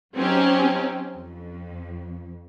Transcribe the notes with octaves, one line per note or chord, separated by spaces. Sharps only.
F#3 C4 C#4 D#4 G4
F2